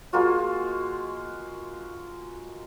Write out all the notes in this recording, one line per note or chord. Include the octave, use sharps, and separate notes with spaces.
G#3 A#3 F4 F#4